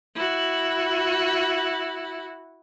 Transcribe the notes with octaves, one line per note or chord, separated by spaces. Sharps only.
E4 F#4